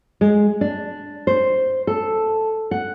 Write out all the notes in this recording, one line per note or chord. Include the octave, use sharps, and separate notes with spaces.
G#3
D4
C5
A4
F#5